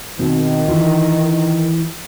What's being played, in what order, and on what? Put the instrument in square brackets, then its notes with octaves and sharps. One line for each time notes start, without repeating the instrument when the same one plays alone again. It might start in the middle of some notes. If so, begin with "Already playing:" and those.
[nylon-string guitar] B2 C4 [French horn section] D#3
[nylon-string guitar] E3 F4